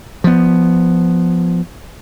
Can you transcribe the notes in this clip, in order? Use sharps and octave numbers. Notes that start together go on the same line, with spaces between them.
F3 B3